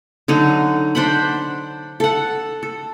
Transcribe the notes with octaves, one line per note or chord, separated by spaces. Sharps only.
D3 F#3 D#4
D4 C5 F#5 B5
A4 F#5
A4